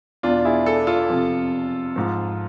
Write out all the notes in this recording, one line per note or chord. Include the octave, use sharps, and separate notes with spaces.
E2 B2 D4 F4
E4 G#4
A4
F4 A4
F2 C3 F3
G#2 F3